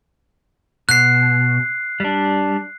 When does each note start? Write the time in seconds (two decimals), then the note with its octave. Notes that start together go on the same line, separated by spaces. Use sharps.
0.89 B2 F#6 C7
2.00 G3 D4